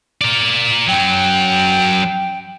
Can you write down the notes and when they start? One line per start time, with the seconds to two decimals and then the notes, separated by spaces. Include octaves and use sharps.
0.21 A#4 D5
0.88 F#2 F#3 G5